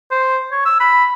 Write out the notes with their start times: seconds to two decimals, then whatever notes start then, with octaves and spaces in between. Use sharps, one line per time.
0.11 C5
0.52 C#5
0.66 E6
0.80 B5